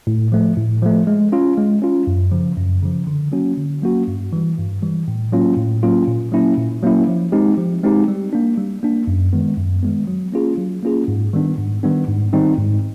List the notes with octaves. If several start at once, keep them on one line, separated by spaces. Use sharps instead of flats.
A2
F3 A3
A2
F3 A3
G#3
C#4 F4
G#3
C#4 F4
F#2
C#3 F3
F#2
C#3 F3
D3
F#3 A#3 C#4 F#4
D3
F#3 A#3 C#4 F#4
G2
E3 G3
G2
E3 G3
A2
F#3 A#3 C#4 F4
A2
F#3 A#3 C#4 F4
A#2
F#3 A#3 C#4 E4
A#2
F#3 A#3 C#4 E4
F3
G#3 C4 D#4 G4
F3
G#3 C4 D#4 G4
G3
A#3 D4
G3
A#3 D4
F#2
D#3 G#3 B3
F#2
D#3 G#3 B3
F#3
A#3 C#4 F4 G#4
F#3
A#3 C#4 F4 G#4
G#2
D#3 G3 B3 D4
G#2
D#3 G3 B3 D4
G#2
D#3 G3 C4 D#4
G#2